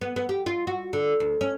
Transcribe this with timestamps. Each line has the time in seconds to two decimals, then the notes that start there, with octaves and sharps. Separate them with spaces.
0.01 B3
0.16 B3
0.29 G4
0.46 F4
0.67 F#4
0.93 D3
1.20 D2
1.41 C#4